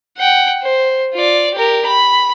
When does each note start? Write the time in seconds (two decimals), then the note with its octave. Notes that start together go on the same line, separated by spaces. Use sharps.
0.17 F#5 G5
0.62 C5
1.14 F4 D5
1.54 G4 A#4
1.86 B5